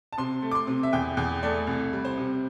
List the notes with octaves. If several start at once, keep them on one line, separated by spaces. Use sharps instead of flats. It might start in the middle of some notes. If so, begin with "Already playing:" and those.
A5
C3 C6
A3
D6
C6
C3
E5
E2 G5
E2 G5
A3 D5
C2
G3
C5
C3